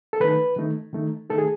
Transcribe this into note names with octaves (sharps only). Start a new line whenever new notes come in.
A4
D#3 A3 D#4 B4
D#3 A3 D#4
D#3 A3 D#4
D#3 A3 D#4 A4
G#4